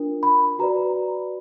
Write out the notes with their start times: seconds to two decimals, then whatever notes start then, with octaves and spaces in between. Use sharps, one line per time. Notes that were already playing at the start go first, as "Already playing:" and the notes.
Already playing: D4 F4 A#4
0.23 B5
0.59 F#4 B4 D5 A#5